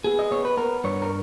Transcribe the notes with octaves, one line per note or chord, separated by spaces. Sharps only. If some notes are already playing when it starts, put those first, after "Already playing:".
B3 G#4
D#5
B3 C#5
B4
B3 A#4
G2 C#5
A#4